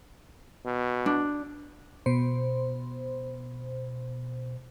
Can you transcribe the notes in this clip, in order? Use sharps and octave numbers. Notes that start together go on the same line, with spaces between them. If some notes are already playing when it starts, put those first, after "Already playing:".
B2
D4
B2 C5